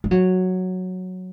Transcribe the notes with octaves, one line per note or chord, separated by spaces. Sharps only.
G3
F#3